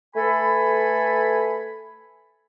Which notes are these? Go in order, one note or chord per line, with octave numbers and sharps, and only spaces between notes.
A3 A4 B4 G#5 B5